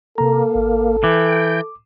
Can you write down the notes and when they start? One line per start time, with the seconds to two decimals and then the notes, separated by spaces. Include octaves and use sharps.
0.18 C3 A#3 A4 A#5
0.55 G#1
1.04 E3 G5 D6